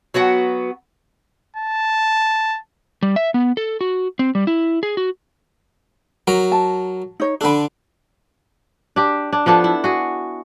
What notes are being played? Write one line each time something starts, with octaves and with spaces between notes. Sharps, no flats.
F#3 B3 F#4 F#5
A5
G3
E5
B3
A4
F#4
C4
G3
E4
G#4
F#4
F#3 A#4
A5
D#4 C#5
D3 D4 A4 B5
D4 G4
D4
F3 B3 D4 A4
E4
F#4 G#4